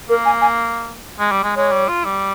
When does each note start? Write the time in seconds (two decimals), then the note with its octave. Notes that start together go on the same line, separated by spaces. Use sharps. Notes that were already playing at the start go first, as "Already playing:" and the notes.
0.09 A#3 A#4
0.25 G#5
0.41 G#5
1.19 G#3
1.32 G3
1.43 G#3
1.56 G#3 C#5
1.72 G3
1.89 F4
2.05 G3